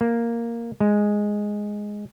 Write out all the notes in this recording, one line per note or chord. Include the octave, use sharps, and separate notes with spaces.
A#3
G#3